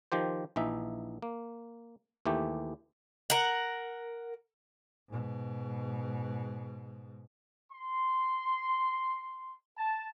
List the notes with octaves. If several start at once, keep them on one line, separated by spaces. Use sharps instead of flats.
D#3 F3 G4 C5
A#1 E3 D#4 E5
A#3
D#2 E3 A3 G4
A#4 F#5
G#2 B2
C6
A5